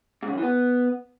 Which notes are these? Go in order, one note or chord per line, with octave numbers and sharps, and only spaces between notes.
G#2
C#3
F#2
E3
B3